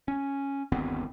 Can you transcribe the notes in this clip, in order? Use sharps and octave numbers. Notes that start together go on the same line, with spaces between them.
C#4
G1 D#2 B3 C4